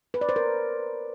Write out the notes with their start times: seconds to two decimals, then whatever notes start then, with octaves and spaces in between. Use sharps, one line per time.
0.14 B4
0.21 D5
0.29 C5
0.36 A#4